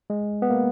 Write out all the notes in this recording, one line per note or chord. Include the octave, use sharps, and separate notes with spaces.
G#3
B3
A#3